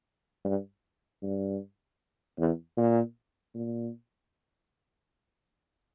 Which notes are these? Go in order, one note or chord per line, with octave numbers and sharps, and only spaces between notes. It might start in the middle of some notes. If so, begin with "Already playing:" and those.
G2
G2
E2
A#2
A#2